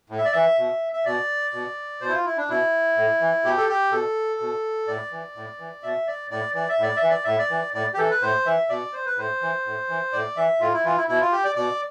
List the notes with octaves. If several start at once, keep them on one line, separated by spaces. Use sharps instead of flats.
A2
E5
D5
E3 E5
B2
E5
B2 D5
B2
B2 C5
E4
F4
E4
D4
B2 E4
A2
E3
B2 G4
A4
G4
B2 A4
B2
A2 D5
E3
A2
E3
B2 E5
D5
A2 D5
E3 D5
E5
A2 D5
E5
E3
D5
A2 E5
D5
E3
A2 D5
G4
E3 A4
B4
A2 C5
E3 E5
B2 D5
C5
B4
A2 C5
E3
A2
E3
A2 D5
E3 E5
A2 F4
E4
E3 F4
E4
B2 E4
F4
G4
D5
B2 D5